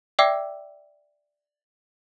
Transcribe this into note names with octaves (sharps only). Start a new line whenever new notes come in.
D5 E5 G5 D6 E6 C7